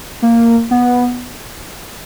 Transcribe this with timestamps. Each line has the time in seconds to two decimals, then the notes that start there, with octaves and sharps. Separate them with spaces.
0.22 A#3
0.71 B3